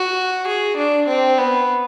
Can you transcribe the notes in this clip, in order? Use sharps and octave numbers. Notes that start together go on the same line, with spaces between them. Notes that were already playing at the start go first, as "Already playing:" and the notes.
Already playing: F#4
G#4
D4
C4
B3